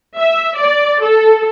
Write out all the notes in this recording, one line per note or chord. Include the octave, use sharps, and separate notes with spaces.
E5
D5
A4